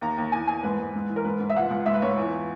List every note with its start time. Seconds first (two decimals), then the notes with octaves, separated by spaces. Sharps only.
0.01 D#2 A#5
0.18 D#2
0.32 E2 G#5
0.47 E2 G#5
0.63 G#2 B4
0.79 G#2
0.95 G#2
1.09 E3
1.16 A#4
1.24 G#2 B4
1.40 G#2
1.49 E5
1.56 C#2 F#5
1.70 C#2
1.86 G#2 E5
1.94 B4
2.02 G#2 C#5
2.17 E2